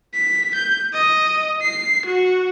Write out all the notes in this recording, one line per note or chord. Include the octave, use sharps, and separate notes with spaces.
B6
G6
D#5
C7
F#4